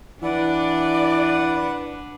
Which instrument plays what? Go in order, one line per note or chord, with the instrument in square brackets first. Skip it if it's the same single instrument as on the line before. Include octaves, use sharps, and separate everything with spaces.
[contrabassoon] E3 [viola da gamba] D4 [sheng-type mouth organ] B4 F#5 [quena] D5